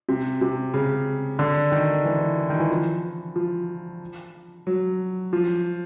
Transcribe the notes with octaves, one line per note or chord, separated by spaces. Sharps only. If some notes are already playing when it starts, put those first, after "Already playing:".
C3
C3
C#3
D3
D#3
E3
D#3
E3
F3
F3
F#3
F3